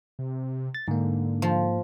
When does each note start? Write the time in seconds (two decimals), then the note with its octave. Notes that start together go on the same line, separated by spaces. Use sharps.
0.19 C3
0.75 A6
0.88 G#2 D3 A#3
1.42 F3